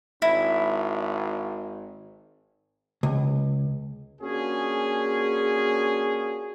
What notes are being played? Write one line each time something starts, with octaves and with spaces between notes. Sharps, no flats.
G#1 E4
C#2
A#3 C#4 D4 F4 F#4 G#4